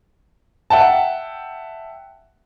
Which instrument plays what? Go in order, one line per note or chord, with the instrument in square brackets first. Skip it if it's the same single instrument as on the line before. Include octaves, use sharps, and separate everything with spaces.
[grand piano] E5 F#5 G5 A5